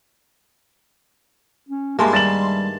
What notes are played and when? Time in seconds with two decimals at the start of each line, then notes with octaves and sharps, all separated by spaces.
1.69 C#4
1.99 G2 G#3 A#3 G4 E5 A5 C6
2.13 D#3 G3 A6 E7 F#7